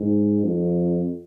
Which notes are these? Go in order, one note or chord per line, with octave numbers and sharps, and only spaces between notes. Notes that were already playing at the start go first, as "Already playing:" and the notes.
Already playing: G#2
F2